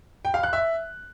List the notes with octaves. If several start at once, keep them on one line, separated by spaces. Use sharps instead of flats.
G5
F5
F#6
E5